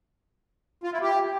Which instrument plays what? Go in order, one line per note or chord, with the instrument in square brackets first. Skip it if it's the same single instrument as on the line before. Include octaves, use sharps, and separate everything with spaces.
[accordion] F4
E4
G4